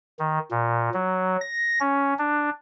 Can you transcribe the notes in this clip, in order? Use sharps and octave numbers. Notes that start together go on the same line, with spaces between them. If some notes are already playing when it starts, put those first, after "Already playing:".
D#3
A#2
F#3
A#6
C#4
D4